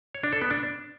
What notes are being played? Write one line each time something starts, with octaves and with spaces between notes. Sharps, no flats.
C#5
D4
A4
B3
D4